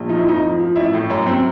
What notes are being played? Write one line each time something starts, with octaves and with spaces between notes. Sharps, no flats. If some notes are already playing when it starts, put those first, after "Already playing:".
Already playing: A#1
F3 D#4
E4
F2 D#4
F3
F3
A1 E4
A2
F#2 C#4
F#2 C4